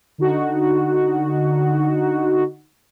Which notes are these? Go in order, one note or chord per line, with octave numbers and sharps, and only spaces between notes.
D3 D#4 F#4